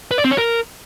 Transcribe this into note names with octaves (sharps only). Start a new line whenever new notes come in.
B4
D5
C4
C#5
A#4